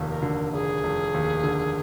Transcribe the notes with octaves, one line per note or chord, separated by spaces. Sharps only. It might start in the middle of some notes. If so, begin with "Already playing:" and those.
Already playing: F1 D#2
A#4
D3
F1 G#4
F1
D#2
D3